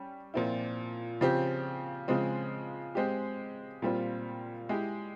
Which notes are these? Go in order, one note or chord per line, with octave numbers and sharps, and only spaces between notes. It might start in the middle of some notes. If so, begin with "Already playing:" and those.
Already playing: G3 C#4
A#2 F3 C4 E4
C#3 F3 C4 G4
C#3 F3 G#3 C4
G#3 C4 G4
A#2 G3 C4 F4
G#3 E4 G4